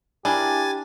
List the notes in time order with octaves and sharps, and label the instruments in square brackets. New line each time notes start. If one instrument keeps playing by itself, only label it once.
[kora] D4 [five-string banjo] E4 G#4 A#4 [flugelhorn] G4 [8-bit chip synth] G#5 A6